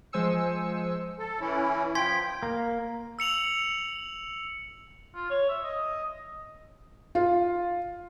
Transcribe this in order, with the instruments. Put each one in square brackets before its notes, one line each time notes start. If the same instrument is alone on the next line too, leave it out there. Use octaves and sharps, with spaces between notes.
[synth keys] F3 G#3 C5 G#5 E6 C#7
[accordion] A4
E3 C#4 E4
[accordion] F3 G5 [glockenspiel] C6 G#6 B6
[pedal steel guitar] A#3
[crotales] E6 C#7 F7 F#7
[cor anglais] F4
C#5
E5
D#5
[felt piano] F4